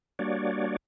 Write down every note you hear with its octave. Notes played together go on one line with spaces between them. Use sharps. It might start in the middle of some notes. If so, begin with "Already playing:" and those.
G3 A#3 D4 F#4 C#5 D5